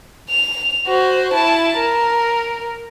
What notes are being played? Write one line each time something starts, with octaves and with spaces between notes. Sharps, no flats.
F7
F#4 C5
E4 A5
A#4